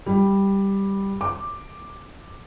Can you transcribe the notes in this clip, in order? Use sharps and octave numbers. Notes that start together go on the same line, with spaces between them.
G3
D6